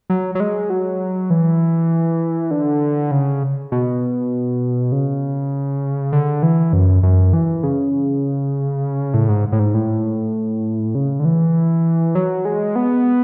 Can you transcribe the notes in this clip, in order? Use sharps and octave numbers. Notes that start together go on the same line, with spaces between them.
F#3
F#3
G#3
F#3
E3
D3
C#3
B2
C#3
D3
E3
F#2
F#2
E3
C#3
A2
G#2
A2
G#2
A2
C#3
D3
E3
F#3
G#3
B3